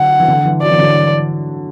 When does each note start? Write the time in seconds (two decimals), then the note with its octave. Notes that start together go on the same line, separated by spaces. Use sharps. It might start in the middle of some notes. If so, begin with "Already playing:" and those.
Already playing: D3 F#3 F#5
0.20 E3
0.28 D3
0.46 E3
0.62 F#3 D5
0.71 E3
0.79 D3 F#3